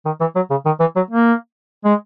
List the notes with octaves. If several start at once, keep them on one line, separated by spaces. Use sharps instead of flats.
D#3
E3
F#3
C#3
D#3
E3
F#3
A#3
G#3